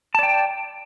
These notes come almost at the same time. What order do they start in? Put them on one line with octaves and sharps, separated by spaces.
A5 D5 G5